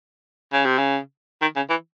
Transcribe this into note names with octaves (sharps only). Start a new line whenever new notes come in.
C#3
C3
C#3
D#3
C#3
E3